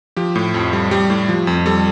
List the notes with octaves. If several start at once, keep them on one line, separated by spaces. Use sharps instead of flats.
F3 G4
A2
F2
G3
G3 G4
A2
F3
F2
G3 A4